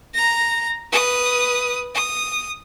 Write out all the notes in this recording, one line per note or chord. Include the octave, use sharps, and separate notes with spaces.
A#5 A#6
B4 D#6
D#6